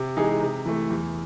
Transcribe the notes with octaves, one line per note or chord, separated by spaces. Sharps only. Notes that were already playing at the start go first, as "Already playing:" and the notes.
Already playing: C3
E3 G#3 D#4 G#4
C3
E3 A3
E2